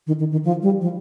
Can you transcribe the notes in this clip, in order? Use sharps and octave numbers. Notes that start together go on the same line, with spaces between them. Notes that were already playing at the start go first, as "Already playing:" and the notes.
D#3
D#3
D#3
F3
G3
F3